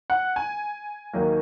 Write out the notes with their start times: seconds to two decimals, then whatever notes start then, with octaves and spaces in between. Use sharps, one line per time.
0.10 F#5
0.36 G#5
1.13 D#2 D#3 F#3 A#3